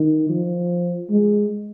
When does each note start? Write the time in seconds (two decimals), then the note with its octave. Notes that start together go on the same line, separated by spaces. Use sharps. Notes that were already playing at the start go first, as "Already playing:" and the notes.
Already playing: D#3
0.29 F3
1.11 G#3